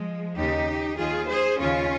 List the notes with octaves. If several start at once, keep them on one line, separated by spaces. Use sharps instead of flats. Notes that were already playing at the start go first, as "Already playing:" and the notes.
Already playing: F3 G#3
D#2 C#3 D#4 G4
D#2 D#3 F4 G#4
G#4 C5
D#2 C#3 C#4 F4